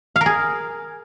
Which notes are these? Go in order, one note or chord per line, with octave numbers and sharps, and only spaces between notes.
F5
A#4
G#4